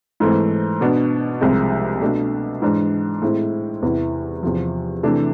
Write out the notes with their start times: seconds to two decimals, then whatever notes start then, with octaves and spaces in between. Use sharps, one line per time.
0.20 G#2 E3 A3 C4
0.81 B2 B3 D4
1.41 C2 C3 F3 G#3
2.01 B2 A3 D4
2.62 G#2 E3 G#3 D4
3.22 A2 G#3 C4 E4
3.82 E2 C3 E3 B3 E4
4.43 E2 C3 F3
5.03 C3 E3 A3 D4